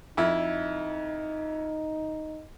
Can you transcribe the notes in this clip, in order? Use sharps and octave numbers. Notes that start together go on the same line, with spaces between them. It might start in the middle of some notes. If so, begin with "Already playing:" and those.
F2 D#4 E4